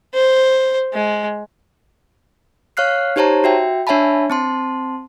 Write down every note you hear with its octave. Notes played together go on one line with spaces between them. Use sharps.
C5
G#3
C#5 F5 F6 F#6 C7
D#4 G4 C5 C#5 A5 A#5
F#4 E5 G5
D4 C#5 E5 G#5 A5 B5
C4 A5 C6